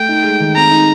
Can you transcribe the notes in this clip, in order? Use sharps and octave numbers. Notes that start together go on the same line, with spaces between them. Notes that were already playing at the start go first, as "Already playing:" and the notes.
Already playing: A3 G5
D#4
G#3
D#3
C4 A#5
D#4